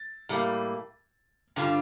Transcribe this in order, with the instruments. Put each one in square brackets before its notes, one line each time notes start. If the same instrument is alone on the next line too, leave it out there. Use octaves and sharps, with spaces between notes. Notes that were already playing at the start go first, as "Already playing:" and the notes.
Already playing: [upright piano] A6
[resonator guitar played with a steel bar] A2 G3 A#3
G2 D3 G3 F4